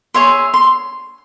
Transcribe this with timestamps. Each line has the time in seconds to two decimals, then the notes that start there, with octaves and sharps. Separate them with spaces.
0.14 G#4 C#5 E5 C6
0.54 C6